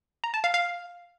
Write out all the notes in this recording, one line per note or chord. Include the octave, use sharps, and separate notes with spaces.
A#5
A5
F5
F5